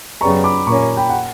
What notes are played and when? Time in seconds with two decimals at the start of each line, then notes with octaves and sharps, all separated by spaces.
0.21 F#2 C#3 G3 B3 A#5 C#6
0.44 B5 D6
0.67 A#2 A#3 C#4 A#5 C#6
0.97 G5 B5
1.10 F#5